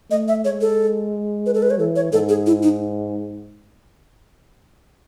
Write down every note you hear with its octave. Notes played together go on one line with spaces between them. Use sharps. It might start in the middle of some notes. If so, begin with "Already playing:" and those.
A3 D#5
E5
G#3 C#5
A4
B4
A4
B4
C#5
E3 A4
C#5
G#2 A4
G#4
E4
D#4